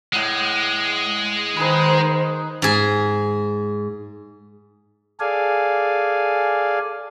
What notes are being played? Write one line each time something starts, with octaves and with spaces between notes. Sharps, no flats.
A2 G#3 F#5
D#3 D#4 G#4 B4 C5
G#2 G#4
G#4 A4 D5 F5 G#5